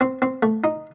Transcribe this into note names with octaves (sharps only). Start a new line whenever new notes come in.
C4
C4
A3
D#4